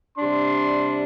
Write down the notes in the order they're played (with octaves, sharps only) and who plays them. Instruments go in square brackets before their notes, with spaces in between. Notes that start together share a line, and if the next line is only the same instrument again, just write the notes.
[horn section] C3 G3 D4 C6